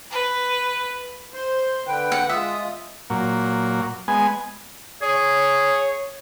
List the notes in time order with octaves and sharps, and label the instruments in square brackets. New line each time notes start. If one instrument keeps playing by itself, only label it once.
[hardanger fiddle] B4
[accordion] C5 C6
D3 B4 G5
[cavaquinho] F#5
[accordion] G#3 F4 D#6 [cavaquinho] E5
[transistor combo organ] A#2 F#3
G#3 B3 G#5
[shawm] G#4 [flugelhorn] C#5